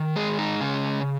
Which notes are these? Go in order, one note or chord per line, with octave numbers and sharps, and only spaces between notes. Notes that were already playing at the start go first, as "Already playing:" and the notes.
Already playing: D#3
G#3 G#4
D#4
C#3 C#4